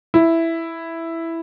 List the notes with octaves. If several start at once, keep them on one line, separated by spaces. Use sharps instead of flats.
E4